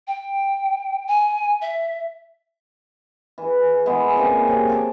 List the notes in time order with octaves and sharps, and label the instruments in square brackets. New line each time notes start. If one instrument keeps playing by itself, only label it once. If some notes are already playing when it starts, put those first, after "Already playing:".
[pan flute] G5
G#5
E5
[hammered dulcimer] E3 G#4
E3 G#3 B3
A#2 C#3 C4 C#6
C3 C#5
A#3 A4 D6